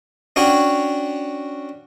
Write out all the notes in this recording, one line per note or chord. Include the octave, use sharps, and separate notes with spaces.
C#4 D4 F#4 C#5 G5